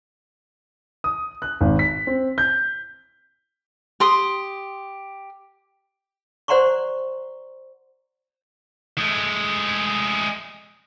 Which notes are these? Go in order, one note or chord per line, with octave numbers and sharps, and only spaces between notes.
D#6
F#6
G#1
B6
C4
G6
G4 C6 D#6
C5 D5 F#5 A#5 C6 C#6
G#3 A3